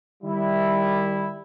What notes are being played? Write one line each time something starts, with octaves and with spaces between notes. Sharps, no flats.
D#3 G3 E4